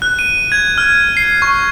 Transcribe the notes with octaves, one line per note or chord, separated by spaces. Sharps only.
F#6
D#7
G#6
F6
C7
C#6